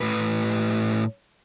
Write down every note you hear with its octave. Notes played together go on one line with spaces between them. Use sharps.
A2 B4